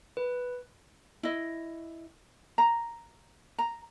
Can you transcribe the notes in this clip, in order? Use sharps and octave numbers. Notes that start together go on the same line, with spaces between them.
B4
E4 D#5
A#5
A#5